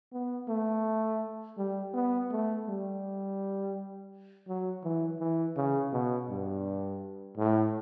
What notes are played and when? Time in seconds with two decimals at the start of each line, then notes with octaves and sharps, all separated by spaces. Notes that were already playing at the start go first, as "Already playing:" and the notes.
0.13 B3
0.49 A3
1.58 G3
1.94 B3
2.31 A3
2.67 G3
4.48 F#3
4.84 E3
5.20 E3
5.56 C#3
5.93 B2
6.30 G2
7.37 A2